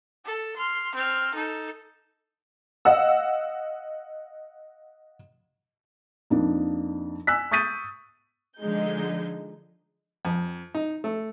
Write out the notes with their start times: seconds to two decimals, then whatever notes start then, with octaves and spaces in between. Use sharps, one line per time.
0.25 A4
0.56 C6 F6
0.95 C4 F6
1.34 D#4 A4
2.85 D#5 F5 F#5 E6
6.30 F2 A#3 D4 D#4
7.27 G#5 E6 F#6 B6
7.51 C#6 D#6 G6 A6 B6 D#7
8.59 D3 F3 G#3 D#4 G6
10.25 F2
10.75 D#4
11.04 A3